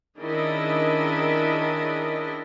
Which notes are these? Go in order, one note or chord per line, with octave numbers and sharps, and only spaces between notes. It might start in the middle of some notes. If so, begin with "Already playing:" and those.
D#3 C#4 D4 E4 G#4 D#5